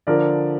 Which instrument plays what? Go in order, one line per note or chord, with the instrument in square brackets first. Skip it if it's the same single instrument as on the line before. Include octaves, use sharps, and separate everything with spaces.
[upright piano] D3 F3 A#4 D5